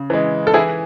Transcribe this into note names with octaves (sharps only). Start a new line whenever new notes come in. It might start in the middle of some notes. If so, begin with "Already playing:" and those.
Already playing: C#3
E3 G#3
A4
E3 E4 G#4